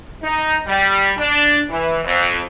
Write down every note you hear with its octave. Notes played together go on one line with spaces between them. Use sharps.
D#4
G3
D4
E3
F2